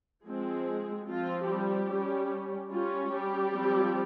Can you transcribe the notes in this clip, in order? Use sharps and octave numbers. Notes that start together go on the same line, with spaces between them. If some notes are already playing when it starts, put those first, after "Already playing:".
F3 G#3 C4 G#4
F3 C4 F4
G3 G4
G3 C#4
G3 C#4 F4
G3 G4
F3 C4